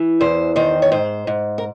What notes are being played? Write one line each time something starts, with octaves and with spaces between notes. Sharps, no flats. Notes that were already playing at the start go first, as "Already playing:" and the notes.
Already playing: E3
E2 C5
D#3 C5
C#5
G#2 C5
G#2
A#4